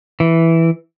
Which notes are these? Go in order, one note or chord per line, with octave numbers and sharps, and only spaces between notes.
E3